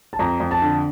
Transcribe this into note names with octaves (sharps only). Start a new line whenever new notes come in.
A5
F2 A#5
F2
A5
D3